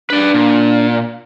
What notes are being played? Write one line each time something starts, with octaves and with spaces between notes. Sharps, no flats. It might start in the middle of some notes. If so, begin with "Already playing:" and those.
D4 B4 D5
A#2